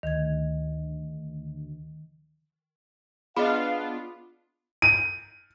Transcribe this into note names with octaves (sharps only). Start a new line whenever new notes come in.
D2 D#3 G#6
B3 D4 F4 G#4 D#5 F5 B5
D#7